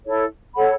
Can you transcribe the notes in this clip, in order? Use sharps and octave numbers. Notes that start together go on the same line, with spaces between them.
E4 A4 C#5
A4 C#5 F#5 B5